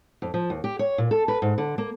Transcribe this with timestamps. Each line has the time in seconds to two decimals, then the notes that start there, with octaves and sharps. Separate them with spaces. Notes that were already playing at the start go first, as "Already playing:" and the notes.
0.22 F2
0.34 F3
0.50 D#2
0.64 G4
0.79 C#5
0.98 A#2
1.11 A4
1.28 B4
1.42 G#2
1.58 D3
1.78 A#3